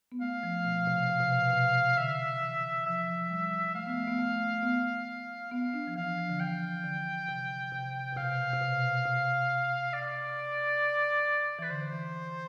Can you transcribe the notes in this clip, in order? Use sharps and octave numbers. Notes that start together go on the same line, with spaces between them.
B3
A3 F5
F3
B2
C3
B2
C3
B2
B2
C3
D3 E5
E3
F3 E5
G3
A3 F5
B3
A3
B3
A3
B3
B3 F5
D4
F3
E3 F5
F3
D3
E3 G5
D3
C3
C3
B2
C3 F5
C3
B2
C3
D5
E3 B4
D3 C5
E3